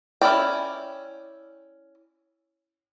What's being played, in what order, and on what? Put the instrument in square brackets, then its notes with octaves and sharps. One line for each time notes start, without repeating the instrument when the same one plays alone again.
[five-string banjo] C#4 E4 D5 G5